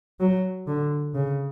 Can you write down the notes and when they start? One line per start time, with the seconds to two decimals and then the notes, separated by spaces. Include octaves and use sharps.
0.20 F#3
0.67 D3
1.14 C#3